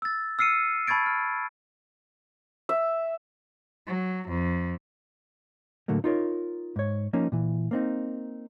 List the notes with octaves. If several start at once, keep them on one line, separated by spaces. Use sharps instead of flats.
E6 A6
E6 F6 C7 C#7 D#7
A5 B5 C#6 G#6 A6 D7
F6
E5
F#3
F2
A2 D3 F#3 A3 A#3
D#4 F4 A#4 C#5
G#2 C#5
F3 A#3 C#4 D#4
A#2 E3
A#3 C4 D#4